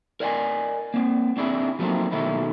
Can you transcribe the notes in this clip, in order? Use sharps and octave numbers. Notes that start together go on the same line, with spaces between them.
A#4 D5 D#5 F#5 G#5
A#3 C4
C4 D4 E4 G#4
F3 F#3 A3 A#3 C4 D#4
B2 D#3 A3 D#4 E4